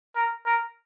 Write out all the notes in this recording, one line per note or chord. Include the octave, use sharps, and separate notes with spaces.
A#4
A#4